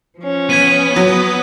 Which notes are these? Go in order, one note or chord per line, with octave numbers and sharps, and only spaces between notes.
F3 C#4
B3 G#6 B6 D#7
F#3 D#6